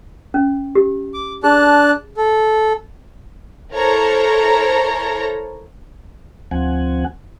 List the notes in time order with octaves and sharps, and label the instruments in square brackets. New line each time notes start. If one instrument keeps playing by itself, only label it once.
[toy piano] C#4
G4
[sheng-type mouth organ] D6
[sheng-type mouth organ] D4 A5 F#6 [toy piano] G#4
[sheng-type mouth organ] A4
[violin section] E4 A4 A#4 C5 C#5 A#5
[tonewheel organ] D2 F3 C4 F#5 G#5